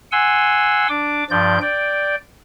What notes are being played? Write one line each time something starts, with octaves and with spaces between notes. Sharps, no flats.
F#5 G#5 C6 E6
D4 D6
G2 F3 D5 G6
D5 G5